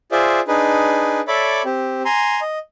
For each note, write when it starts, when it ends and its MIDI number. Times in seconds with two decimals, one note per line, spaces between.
0.12 0.40 65
0.12 0.40 68
0.12 0.40 72
0.12 0.40 74
0.12 0.40 76
0.48 1.21 62
0.48 1.21 63
0.48 1.21 68
0.48 1.21 71
1.28 1.62 69
1.28 1.62 73
1.28 1.62 74
1.28 1.62 76
1.28 1.62 83
1.28 1.62 86
1.65 2.02 60
1.65 2.02 67
2.05 2.40 80
2.05 2.40 82
2.05 2.40 84
2.41 2.58 75